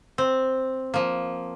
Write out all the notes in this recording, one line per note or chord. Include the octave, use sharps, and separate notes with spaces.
C4
F3 A#3